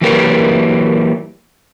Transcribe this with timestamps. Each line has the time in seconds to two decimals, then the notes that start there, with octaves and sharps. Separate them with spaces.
0.01 E3 F#3 A#3 G4 A#4 B4